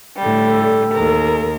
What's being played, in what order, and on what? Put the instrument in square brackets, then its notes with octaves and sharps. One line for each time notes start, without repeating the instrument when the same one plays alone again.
[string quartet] A2 D3 G3
[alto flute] A4
[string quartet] D#2 A#4